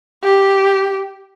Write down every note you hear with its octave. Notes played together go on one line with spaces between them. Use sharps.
G4